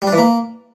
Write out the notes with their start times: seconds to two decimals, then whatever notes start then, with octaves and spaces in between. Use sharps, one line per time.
0.02 G3
0.07 D4
0.12 E3
0.18 A#3